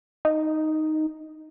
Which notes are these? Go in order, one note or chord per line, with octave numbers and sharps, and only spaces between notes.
D#4